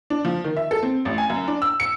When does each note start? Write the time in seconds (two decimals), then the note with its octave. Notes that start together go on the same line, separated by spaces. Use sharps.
0.10 D4
0.25 F3
0.44 D#3
0.57 E5
0.71 A4
0.83 C4
1.05 A1
1.18 G#5
1.30 F#2
1.48 D4
1.62 E6
1.80 C#7